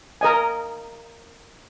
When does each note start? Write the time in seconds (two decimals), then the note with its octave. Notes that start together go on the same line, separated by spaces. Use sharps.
0.21 A#4 D#5 G#5